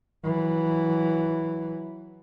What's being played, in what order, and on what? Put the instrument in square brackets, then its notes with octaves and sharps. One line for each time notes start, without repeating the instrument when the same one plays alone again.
[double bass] E3 F#3